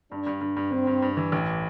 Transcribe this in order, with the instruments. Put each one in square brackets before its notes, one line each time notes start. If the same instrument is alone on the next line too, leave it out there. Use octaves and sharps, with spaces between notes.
[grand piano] G2 [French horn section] D4
[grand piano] G2
G2
G2
[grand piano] G2 [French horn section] C4
[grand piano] G2
G2
E3
A1